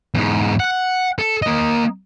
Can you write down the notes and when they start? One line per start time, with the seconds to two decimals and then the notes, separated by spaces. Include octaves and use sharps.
0.15 E2 G#2
0.60 F#5
1.18 A4
1.42 A#3 D#5